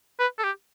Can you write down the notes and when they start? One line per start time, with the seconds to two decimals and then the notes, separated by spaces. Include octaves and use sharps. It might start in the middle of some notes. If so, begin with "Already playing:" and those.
0.19 B4
0.39 A4
0.44 G4